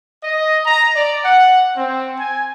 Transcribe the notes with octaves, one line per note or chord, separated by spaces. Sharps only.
D#5
A#5
D5
F#5
C4
G#5